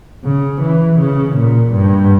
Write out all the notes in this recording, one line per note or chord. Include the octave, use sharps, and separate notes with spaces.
C#3
E3
C#3
A#2
G2